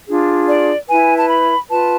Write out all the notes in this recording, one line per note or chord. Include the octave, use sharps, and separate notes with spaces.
D4 F4 G#4
D5
E4 B4 G#5
A5
B5
F4 B4 A5